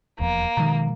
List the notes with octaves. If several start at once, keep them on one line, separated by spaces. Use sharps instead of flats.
D#1 E2 F3 A#3
B2 D#3 F3 G#3 A#5